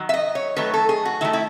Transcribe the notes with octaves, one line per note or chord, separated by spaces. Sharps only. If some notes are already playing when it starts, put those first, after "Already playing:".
Already playing: D#3 F#3
E5
D#5
C#5
D#3 F#3 A3 B4
A4
G#4
F#4
D#3 A3 E4
E4